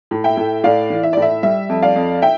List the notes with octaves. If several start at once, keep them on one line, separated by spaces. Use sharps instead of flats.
A2
E5 G5
A2
A2 D5 F5
E3
E5
A2 D5
E5
G3 E5
F2
D5 F5
F2
E5 G5